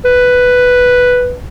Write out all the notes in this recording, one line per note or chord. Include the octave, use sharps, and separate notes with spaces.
B4